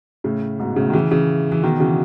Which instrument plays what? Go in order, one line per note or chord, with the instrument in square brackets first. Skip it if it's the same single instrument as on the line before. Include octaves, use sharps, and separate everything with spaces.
[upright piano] A2 C#3
G#2 B2
A2 C#3
D#3
C#3 E3
C#3 E3
E3
B2 D#3
C#3 E3